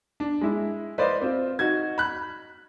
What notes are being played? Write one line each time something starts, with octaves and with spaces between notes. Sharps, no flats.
D4
G#3 E4
B4 C5 D5 D#5 F5
C4 F4
D#4 F#4 G#6
B5 F#6